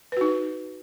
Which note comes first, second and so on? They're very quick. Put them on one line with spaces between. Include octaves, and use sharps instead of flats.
B4 F#4 D#4